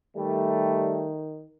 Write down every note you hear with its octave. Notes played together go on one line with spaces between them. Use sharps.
D#3 G3 A3